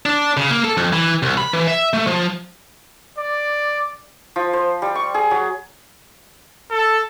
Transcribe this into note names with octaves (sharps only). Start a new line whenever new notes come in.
D4
C#3
A#3
A4
F2
E3
C2
B5
E3
E5
A3
F3
D5
F3
C5
G3
C#6
G#4
F#3
A4